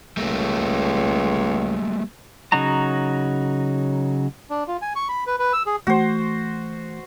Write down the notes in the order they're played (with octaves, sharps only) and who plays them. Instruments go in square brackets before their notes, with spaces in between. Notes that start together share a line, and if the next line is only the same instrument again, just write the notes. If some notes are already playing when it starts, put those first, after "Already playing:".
[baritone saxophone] C#2 [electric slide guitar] G3 A3 A#3
[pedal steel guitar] C#3 F#3 D#4 F#4 A#5
[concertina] D4
F4
G#5
C#6
B5
B4
B4
E6
G#4
[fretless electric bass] E3 A3 [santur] F#4 C5